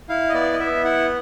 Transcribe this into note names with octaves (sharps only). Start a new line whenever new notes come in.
E4 F5
D#5
B3 D5
D#5
B3 E5
E4 F#5